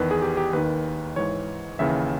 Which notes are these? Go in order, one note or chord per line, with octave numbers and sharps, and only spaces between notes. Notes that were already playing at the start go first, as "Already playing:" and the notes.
Already playing: E2 D#3 B4
G#4
G4
G4
D#2 D#3 B4
G#2 E3 C#5
D#2 C#3 E3 E5